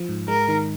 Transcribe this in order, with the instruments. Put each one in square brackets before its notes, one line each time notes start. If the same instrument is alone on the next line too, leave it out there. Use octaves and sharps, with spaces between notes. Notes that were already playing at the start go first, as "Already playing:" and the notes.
Already playing: [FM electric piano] F3
G#2
[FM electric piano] G#3 [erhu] A#4
[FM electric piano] D#3